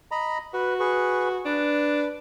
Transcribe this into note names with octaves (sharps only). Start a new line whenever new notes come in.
D#5 A#5 B5
F#4 B4
G#4 B4 C#6
D4 B4